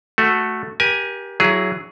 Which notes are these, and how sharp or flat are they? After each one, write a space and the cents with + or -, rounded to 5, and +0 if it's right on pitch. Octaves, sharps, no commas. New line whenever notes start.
A3 +0 F#4 +0
G4 +0 A#4 +35 G#5 +0
F#3 +10 E4 +30 G#4 +0